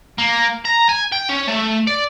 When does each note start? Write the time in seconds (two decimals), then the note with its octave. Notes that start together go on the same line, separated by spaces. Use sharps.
0.18 A#3
0.65 A#5
0.89 G#5
1.12 G5
1.29 C#4
1.48 A3
1.87 D5